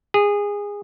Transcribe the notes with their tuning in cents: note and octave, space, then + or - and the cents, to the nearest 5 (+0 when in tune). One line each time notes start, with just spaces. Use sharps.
G#4 -20